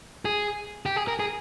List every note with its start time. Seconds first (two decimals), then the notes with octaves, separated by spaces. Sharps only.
0.25 G#4
0.86 G4
0.96 G#4
1.08 A#4
1.20 G#4